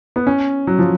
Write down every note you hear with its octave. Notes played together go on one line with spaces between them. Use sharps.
B3
C#4
F#3
F3